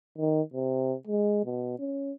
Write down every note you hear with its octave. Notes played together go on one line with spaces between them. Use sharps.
D#3
C3
G#3
B2
C#4